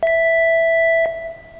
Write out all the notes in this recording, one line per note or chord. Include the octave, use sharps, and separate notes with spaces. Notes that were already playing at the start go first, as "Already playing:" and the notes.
E5 B6